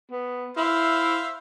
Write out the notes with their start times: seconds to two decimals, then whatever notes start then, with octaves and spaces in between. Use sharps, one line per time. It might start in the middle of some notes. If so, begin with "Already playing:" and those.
0.12 B3
0.57 E4 C5 E5 F5